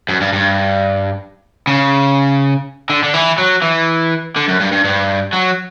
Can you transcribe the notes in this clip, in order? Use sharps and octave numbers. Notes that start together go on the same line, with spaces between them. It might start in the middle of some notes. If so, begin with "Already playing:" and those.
F#2
G2
G2
C#3
D3
D3
E3
F#3
E3
D3
F#2
G2
G2
G2
F#3